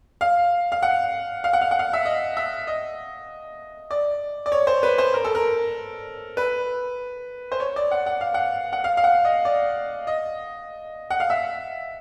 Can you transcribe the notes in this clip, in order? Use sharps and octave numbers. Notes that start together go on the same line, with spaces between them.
F5
F5
F#5
F5
F#5
F5
F#5
F5
E5
D#5
E5
D#5
D5
D5
C#5
C5
B4
C5
A#4
A4
A#4
B4
C5
C#5
D5
F#5
F#5
F5
F#5
F#5
F5
F5
F#5
D#5
D5
D#5
F#5
F5
E5